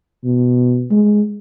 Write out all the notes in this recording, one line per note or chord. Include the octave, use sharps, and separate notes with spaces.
B2
G#3